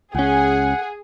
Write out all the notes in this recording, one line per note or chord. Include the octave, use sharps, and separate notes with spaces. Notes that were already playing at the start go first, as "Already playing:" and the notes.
C#2 C#4 G#4 F#5